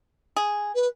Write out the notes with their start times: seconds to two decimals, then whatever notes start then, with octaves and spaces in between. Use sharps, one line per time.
0.36 G#4
0.75 B4